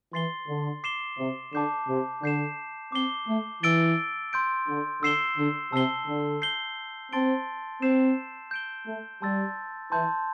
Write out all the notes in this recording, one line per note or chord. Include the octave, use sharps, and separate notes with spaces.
E3 C6 A6 C7 G7
D3
D6 C7 E7 G7
C3
D3 A5 D6 G6 C7 E7
C3
D3 G6 C7 E7
C4 D6 C7 G7
A3
E3 E6 A6 D7 G7
C6 E6 G6 D7
D3
D3 E6 C7 E7 G7
D3
C3 A5 E6 C7 G7
D3
G6 C7 G7
C4 A5 C6 A6 D7 G7
C4 E6 G6 C7 E7
G6 D7 G7
A3
G3 A5 C6 E6 A6
E3 A5 C6 G6